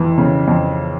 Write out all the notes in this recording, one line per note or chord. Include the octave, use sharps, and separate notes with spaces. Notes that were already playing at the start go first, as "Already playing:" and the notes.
Already playing: F2 E3
C#3
F2